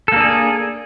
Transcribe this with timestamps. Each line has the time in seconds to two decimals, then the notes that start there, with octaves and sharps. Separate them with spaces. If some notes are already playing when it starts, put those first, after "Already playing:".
0.08 A4
0.12 A#3
0.16 D4
0.21 G#4